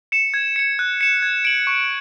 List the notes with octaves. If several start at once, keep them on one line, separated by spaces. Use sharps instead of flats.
C#7 E7
G#6
C#7 E7
F#6
C#7 E7
G#6
D7 F#7
C#6